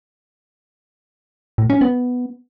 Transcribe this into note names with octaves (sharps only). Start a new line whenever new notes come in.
A2
C#4
B3